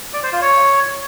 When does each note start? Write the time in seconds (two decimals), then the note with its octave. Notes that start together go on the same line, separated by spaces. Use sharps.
0.14 D5
0.23 C5
0.33 F4
0.42 C#5